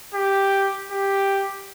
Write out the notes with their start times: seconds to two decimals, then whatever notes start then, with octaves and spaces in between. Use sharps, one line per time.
0.14 G4
0.91 G4